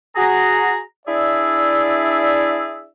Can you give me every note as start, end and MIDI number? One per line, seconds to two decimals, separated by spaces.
0.16 0.80 66
0.16 0.80 68
0.16 0.80 82
1.08 2.86 62
1.08 2.86 64
1.08 2.86 68
1.08 2.86 74
1.08 2.86 76